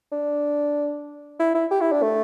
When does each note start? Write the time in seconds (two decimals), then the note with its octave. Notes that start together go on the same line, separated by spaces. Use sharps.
0.12 D4
1.39 E4
1.54 E4
1.71 G4
1.81 E4
1.92 D4
2.02 A3